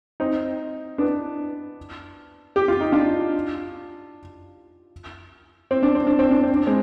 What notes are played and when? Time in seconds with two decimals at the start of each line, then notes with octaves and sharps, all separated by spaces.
0.20 C4 D#4
0.98 B3 D4
2.56 G4
2.68 F4
2.81 D#4
2.92 D4 F4
5.71 C4
5.83 D4
5.95 C4
6.07 D4
6.19 C4
6.31 D4
6.43 C4
6.55 D4
6.67 G#3 C4